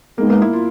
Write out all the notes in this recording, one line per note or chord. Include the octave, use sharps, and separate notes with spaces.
G#3 A#3 B3 D#4
A#3
E4
F4